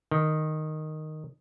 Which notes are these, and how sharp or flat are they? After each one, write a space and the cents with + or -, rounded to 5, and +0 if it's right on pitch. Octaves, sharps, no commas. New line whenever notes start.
D#3 -5